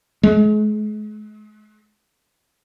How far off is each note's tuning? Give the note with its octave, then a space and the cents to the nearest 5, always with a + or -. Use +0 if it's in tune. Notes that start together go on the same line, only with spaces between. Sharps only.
G#3 +40